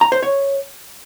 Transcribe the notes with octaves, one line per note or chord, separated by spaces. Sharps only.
A#5
C5
C#5